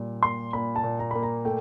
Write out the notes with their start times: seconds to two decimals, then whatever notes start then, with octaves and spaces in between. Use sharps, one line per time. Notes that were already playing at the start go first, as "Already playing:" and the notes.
Already playing: A#2 G3
0.23 A#3 C6
0.53 A#2 B5
0.76 A5
0.84 A#2
0.99 A#5
1.11 A#3 B5
1.23 A#5
1.45 A3 G5